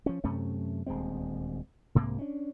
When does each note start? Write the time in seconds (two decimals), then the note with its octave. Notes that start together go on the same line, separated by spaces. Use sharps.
0.06 F3 C#4
0.24 F#2 C3 A3 C#4
0.86 D#1 D2 G#3 C4
1.95 C2 G#2 C3 A#3
2.19 C#4 D4